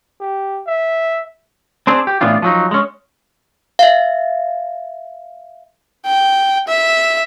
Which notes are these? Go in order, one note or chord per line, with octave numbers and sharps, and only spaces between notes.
G4
E5
C4 D4 G#4
G4
A2 E3 B3 D4 F4
F3 F#3 D#4
G#3 C#4
E5 F5
G5
E5